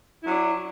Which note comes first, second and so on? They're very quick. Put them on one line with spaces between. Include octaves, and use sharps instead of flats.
E4 F#3 D4